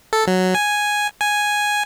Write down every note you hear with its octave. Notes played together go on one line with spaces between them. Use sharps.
A4
F#3
G#5
G#5